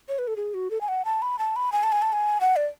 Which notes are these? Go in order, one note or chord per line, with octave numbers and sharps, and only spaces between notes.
C#5
B4
A4
G#4
F#4
A4
G#5
F#5
A5
B5
A5
B5
G#5
A5
G#5
A5
G#5
F#5
D5